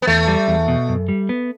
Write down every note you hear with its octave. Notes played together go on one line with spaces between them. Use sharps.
B3
E2 A3
G3
E2
B2
F#2
G3
B3